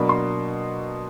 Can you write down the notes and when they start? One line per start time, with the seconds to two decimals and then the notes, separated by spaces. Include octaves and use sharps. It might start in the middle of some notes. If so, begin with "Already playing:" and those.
Already playing: B2 F#3 A#3 D4 B5
0.09 C6